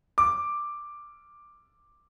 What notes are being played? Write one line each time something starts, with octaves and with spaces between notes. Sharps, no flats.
D6